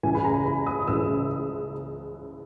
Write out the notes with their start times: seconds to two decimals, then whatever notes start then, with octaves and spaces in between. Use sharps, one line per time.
0.03 C#2 C#3 E3 G#5
0.15 B5
0.25 A#5
0.46 B5
0.66 D#6
0.87 C#2 C#3 E3 E6